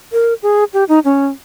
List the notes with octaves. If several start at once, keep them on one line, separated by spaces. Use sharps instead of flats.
A#4
G#4
G4
D#4
C#4